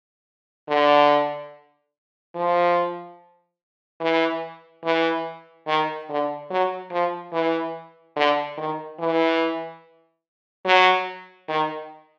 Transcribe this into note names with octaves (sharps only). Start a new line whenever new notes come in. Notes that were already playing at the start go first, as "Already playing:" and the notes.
D3
F3
E3
E3
D#3
D3
F#3
F3
E3
D3
D#3
E3
F#3
D#3